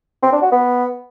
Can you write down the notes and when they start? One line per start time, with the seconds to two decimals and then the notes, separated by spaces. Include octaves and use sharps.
0.23 C4
0.32 D4
0.42 F#4
0.52 B3